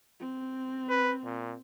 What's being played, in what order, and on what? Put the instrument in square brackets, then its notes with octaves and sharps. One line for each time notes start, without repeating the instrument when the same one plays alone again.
[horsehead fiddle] C4
[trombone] B4
A#2